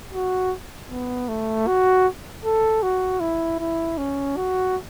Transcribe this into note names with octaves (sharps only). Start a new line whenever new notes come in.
F#4
B3
A3
F#4
A4
F#4
E4
E4
C#4
F#4